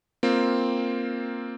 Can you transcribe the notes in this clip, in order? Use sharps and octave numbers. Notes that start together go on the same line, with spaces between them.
A#3 C4 F4